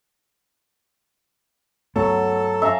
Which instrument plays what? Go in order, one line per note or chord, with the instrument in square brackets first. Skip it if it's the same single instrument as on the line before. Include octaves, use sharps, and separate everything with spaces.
[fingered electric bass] G2 A3 B3 [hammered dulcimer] F#3 [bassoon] A4
[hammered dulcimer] E5 F5 A#5